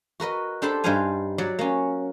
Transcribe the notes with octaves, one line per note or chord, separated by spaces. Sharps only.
F#4 A#4 B4 D#5
D4 G4 A4 C5 A5 B5
G2 G3 D#4 C5 F5 G#5
F#3 D5 F#5
A#3 C#4